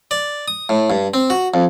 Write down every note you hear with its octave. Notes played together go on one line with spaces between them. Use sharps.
D5
D#6
A2
G2
C4
F#4
F2